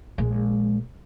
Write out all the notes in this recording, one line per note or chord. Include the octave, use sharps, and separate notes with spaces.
A#1 G#3